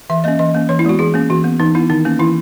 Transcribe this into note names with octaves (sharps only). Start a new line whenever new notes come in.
E3 E5
A#3 C#4 D#5
E3 D#5
A#3 C#4
E3 C#5
E4
G#3 B3 F#4
E3 G#4
A#3 C#4
E3 F#4
B3
E3 D#4
B3 E4
D#3 D#4
A#3 C#4
E3 E4